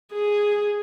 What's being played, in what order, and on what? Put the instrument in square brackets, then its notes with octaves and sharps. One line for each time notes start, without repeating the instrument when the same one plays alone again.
[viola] G#4